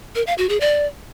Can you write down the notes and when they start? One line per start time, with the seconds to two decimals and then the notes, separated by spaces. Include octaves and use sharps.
0.15 A#4
0.27 F5
0.38 F#4
0.49 G#4
0.60 D5